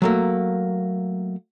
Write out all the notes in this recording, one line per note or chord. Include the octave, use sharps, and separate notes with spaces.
F#3 A3 A#3